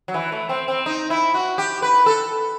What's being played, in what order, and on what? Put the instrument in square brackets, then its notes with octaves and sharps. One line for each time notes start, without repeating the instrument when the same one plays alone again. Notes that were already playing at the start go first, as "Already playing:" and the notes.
[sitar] F#3
E3
A3
C4
C4
D#4
E4
F#4
G4
B4
A4